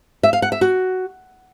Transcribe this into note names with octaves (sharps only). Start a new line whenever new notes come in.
E5
F5
F#5
E5
F#4